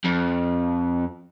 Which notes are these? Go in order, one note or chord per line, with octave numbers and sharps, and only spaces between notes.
F2